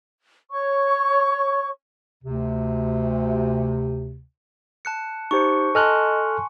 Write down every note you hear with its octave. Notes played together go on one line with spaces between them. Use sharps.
C#5 C#6
D2 C3
A5 F#6 C#7
D#4 G4 C5 C#6 C#7
A4 D#5 G#5 A5 C6 F6 F#6